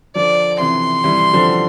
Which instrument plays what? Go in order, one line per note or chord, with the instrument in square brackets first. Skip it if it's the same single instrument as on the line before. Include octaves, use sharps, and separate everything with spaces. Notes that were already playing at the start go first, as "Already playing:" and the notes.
[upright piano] D3 F3 [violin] D5
[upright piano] C3 E3 [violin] C6
[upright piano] E3 G3
D3 F3